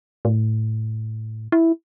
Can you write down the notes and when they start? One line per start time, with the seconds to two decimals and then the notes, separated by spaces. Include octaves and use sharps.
0.25 A2
1.52 E4